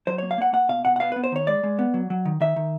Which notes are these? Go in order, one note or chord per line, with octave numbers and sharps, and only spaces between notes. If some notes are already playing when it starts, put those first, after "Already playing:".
F#3 C5
A#3 C#5
F5
A#3 F#5
A#3 F#5
B2 F5
B2 F#5
F#5
B3 F5
B3 B4
C5
D#3 C#5
G#3 D5
G#3
B3
F#3
F#3
D#3
D#3 E5
D#3